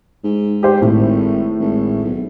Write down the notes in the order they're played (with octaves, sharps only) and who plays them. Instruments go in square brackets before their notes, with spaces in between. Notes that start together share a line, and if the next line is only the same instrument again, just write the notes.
[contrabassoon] G#2
[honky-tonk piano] G4 C5
[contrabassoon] G#1 [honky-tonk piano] A2
[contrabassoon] G#1
B1